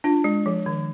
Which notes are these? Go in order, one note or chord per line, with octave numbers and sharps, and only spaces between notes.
D4 F4
G#3
F3
D#3